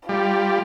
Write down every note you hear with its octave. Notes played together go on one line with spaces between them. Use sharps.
G3 F4